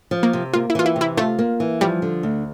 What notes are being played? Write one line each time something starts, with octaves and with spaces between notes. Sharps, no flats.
F3
A#3
C3
A#3 F4
E4
E3 F4
E4
C3
E4
A3 F4
A#3
E3
F3 G3
D3
D2